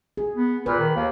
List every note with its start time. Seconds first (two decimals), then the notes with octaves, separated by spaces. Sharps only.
0.17 G#4
0.35 B3
0.66 A#2 B4
0.79 D#3
0.96 D#2